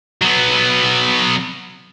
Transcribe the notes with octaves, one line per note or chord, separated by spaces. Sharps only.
F#3 B3